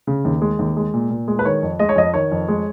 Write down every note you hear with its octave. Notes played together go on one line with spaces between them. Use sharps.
C#3
D#2
G#3
D#2
G#3
A#2
A#2
G#3
B4
D#3 C#5
F2
G#3 D#5
C#5
F2 D#5
D#3 C#5
F2
G#3